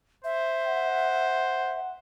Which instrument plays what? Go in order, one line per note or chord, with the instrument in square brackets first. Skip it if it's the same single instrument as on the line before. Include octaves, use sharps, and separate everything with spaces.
[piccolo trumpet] C5 [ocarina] E5
[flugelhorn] F#5